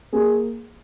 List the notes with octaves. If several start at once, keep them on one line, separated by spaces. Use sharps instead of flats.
A#3 G#4